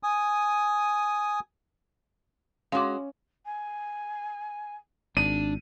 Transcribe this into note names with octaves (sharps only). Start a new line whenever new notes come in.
G#5 D#6
G#3 C#4 F#4 F5 D6
G#5
G#1 D4 D#7